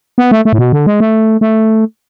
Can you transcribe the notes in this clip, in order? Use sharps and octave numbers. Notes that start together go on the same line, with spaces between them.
B3
A3
A3
A2
B2
D3
G#3
A3
A3